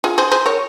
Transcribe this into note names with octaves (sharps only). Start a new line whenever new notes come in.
F4 G#4
G#4 C5
G#4 C5
A#4 C#5